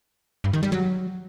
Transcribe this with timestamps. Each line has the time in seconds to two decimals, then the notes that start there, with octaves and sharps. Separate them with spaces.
0.44 G2
0.53 D#3
0.63 G3
0.72 F#3